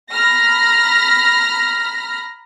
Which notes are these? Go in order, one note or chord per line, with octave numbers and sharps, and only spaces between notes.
A#5 B5 F6 A#6